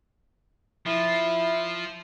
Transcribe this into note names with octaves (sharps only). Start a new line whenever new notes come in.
F3 E4